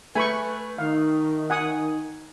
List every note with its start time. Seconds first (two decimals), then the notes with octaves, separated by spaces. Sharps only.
0.15 A3 B4 G#5 B5 C#6
0.78 D#3 D#4 F5
1.50 F#5 G#5 D#6